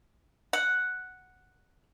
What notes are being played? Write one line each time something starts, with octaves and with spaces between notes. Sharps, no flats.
F#5